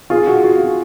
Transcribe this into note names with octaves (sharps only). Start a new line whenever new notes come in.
F4 G#4
F#4
F4
F#4